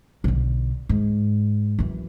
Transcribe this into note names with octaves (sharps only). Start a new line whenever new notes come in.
B1 D3
G#2
F#2 E3